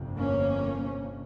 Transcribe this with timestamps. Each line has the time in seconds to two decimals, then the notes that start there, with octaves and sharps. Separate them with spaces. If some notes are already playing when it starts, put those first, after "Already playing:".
Already playing: G1 F2 C3
0.17 A#3 C#4